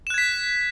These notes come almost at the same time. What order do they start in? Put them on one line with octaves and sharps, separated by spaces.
E7 F#6 G#6 B6